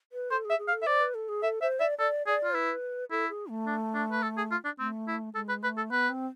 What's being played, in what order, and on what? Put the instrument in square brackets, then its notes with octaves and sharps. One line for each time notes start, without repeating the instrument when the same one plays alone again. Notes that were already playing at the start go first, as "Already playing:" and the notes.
[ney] B4
[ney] A4 [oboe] C5
[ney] G#4
[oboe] E5
[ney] G#4
[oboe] F5
[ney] A4
[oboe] E5
[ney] C5 [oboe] D5
[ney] B4
A4
G#4
[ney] A4 [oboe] E5
[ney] C5 [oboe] E5
[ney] D5 [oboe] E5
[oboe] A4 [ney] D5
[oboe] G#4 [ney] D5
[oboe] F4
[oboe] E4 [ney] B4
[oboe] E4 [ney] A4
[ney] G#4
A3
[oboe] D4
D4
B4
A4
G#4
F4
D4
[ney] A3 [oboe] C4
[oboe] E4
[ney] G#3 [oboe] A4
[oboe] B4
[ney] A3 [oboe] B4
[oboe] A4
[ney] B3 [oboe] B4
[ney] C4